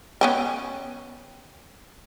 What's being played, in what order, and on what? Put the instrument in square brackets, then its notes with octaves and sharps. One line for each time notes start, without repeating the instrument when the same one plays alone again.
[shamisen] B3 C#4 G5